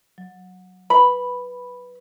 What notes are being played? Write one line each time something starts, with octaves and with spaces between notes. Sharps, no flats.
F#3
B4 B5